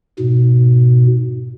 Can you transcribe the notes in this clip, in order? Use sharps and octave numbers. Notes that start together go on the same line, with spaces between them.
G#2 B2